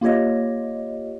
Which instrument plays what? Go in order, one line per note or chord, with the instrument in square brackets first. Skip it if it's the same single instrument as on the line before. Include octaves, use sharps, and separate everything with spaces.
[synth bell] A#3 F4 G4 C#5 D#5